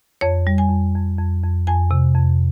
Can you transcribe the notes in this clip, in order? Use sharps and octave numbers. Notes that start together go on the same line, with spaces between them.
F2 C#5
G3
G#5
F2
F2
F2
F2
F2 G#5
C3
F2